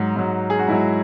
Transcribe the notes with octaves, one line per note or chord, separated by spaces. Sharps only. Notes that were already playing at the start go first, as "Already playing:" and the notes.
Already playing: G#2 F#3 F#4
G#2 F#3
G#4
F#4
G#2 F#3 E4